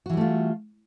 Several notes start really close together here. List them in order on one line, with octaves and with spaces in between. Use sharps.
F#4 E3 G3 A3 F4